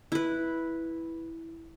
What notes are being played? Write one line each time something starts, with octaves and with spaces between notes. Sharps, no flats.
E4 B4